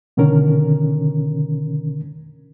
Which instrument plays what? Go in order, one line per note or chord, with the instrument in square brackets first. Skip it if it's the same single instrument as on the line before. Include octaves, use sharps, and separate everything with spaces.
[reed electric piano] B2 D3 D#3 C#4 A#4